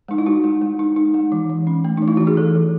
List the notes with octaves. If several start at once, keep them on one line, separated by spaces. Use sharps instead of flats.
G#3 D#4
E4
D#4 F#4
G#3
G#3
D#4
D#4
G#3
E3
E3
C#4
A3
E3 D#4
E4
E3 F#4
G#4
E3 A4
E3